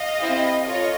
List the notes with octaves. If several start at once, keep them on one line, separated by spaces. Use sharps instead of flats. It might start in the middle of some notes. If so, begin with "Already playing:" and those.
Already playing: D#5 F5
C4 E4 G4
F4 A4 C#5 D#5